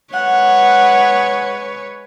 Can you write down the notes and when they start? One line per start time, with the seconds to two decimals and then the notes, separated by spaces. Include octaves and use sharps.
0.13 G#3 B4 C#5 F#5